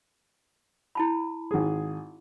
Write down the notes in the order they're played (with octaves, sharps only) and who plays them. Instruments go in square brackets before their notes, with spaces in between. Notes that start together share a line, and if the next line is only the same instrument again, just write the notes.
[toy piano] E4 A5 B5
[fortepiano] G#1 G#4